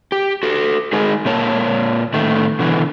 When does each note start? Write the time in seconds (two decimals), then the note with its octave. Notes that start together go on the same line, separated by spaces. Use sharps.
0.12 G4
0.43 F#4 A4
0.93 G#3 D#4 G#4 A#4
1.25 A#2 A#3 C#5 A5
2.14 A2 D#3 A3
2.59 B2 D3 E3